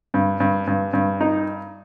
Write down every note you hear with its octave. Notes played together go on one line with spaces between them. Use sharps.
G2
G2
G2
G2
D#4